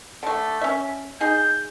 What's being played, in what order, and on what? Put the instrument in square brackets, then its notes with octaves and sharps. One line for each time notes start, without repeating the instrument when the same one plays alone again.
[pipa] D3 A3
C#4 E5
[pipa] D#4 G#4 [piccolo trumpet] G6